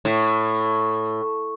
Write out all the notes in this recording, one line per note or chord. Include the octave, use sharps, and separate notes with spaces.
A2